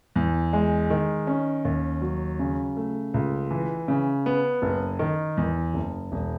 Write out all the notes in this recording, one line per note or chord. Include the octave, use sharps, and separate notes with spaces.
E2
G#3
D#3
C#4
D#2
F#3
C#3
A3
C#2
E3
C#3
B3
F#1
D#3
E2
F#1
E1